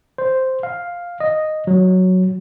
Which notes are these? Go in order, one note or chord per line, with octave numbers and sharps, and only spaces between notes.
C5
F5
D#5
F#3